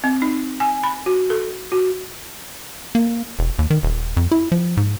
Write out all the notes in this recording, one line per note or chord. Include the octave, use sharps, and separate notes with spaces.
C4
D#4
G#5
B5
F#4
A4
F#4
A#3
E1
D#2
D#3
D#1
F2
E4
F3
G#2